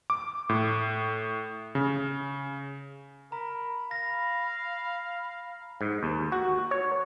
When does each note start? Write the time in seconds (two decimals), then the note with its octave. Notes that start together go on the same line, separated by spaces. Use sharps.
0.10 D6
0.49 A2
1.75 C#3
3.32 A#4 A#5 B5
3.91 F5 A#6
5.81 G#2
6.03 D#2
6.32 F#4
6.71 C#5